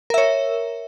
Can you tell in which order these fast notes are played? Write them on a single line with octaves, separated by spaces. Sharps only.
A#4 E5 C#5